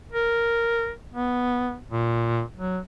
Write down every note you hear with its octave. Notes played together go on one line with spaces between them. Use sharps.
A#4
B3
A#2
F#3